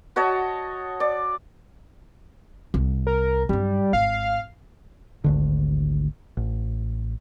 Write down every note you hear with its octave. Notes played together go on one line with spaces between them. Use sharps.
F#4 C#5 D#5 A5
D5
C2
A#4
G2 F#3 G3
G#1 F5
G#1 D2 D3
A1